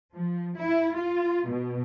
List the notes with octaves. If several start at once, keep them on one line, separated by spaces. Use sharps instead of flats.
F3
E4
F4
B2